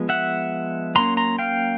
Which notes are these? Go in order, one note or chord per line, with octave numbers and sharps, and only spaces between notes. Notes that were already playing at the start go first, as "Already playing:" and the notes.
Already playing: F3 G#3 B3
E5 F#5
F#3 A#3 C#4 A#5 C6
A#5 C6
F5 G5